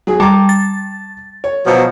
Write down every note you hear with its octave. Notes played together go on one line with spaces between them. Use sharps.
F#3 G#4
G3 A5 A#5 D6
A6
C#5
B2 F3 F#3